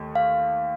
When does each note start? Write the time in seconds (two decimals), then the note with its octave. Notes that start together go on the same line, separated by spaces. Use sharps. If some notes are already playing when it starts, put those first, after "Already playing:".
Already playing: D#2 D#3 A3
0.15 F5